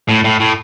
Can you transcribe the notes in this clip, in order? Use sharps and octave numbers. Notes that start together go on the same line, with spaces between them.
A2
A2
A2